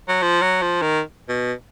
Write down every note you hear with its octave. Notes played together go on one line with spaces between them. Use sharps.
F#3
F3
F#3
F3
D#3
B2